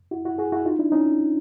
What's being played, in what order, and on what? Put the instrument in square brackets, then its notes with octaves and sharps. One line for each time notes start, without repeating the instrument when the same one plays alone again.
[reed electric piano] E4 F#4
E4 F#4
F#4 G#4
E4 F#4
D#4 F4
D4 E4
C#4 D#4